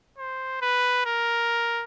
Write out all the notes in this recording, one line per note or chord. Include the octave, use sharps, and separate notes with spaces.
C5
B4
A#4